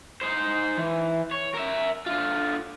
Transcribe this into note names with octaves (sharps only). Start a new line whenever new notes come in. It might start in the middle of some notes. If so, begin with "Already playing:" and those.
D#4 C5
E3
C#5
A#4 E5
D3 F4